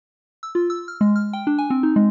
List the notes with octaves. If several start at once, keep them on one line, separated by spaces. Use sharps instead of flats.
E6
F4
E6
F6
G#3
F6
G5
D4
G#5
C4
D#4
G#3